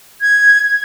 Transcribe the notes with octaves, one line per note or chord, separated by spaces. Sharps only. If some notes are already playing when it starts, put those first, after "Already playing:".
G#6